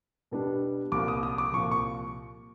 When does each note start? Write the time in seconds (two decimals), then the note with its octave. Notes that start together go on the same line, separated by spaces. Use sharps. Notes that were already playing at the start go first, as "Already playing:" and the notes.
0.31 B2 G3 B3 D4
0.92 C2 A#2 F3 D6
1.08 D#6
1.23 D#6
1.38 D6
1.53 C2 A#2 F3 C#6
1.71 C#6